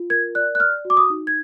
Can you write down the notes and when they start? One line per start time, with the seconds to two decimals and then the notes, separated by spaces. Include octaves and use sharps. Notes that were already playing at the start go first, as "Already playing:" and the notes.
Already playing: F4
0.10 A#4 G#6
0.35 D5 F#6
0.55 F#6
0.60 D5 F6
0.85 F#4
0.90 D6
0.97 D#6
1.10 D#4
1.27 G#6